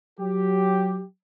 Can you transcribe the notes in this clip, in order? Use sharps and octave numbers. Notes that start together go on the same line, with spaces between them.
F#3 G4